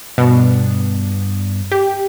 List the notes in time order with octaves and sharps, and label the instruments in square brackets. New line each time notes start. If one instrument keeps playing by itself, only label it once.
[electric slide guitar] G2 B3 D4 [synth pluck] B2
[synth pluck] G4